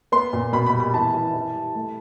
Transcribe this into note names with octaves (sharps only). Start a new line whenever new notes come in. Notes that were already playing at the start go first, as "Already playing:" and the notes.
B3 C6
A#2
B2 B5
B5
G3
B5
E3 A5
E3
E3
G3
A3